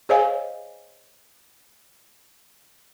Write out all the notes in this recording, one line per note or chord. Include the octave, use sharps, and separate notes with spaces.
G#4 C5 C#5 D#5 F5 G#5